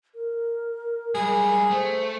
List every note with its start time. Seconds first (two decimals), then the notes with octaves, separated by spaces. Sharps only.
0.15 A#4
1.15 G3 G#3 G#4
1.71 A3 C5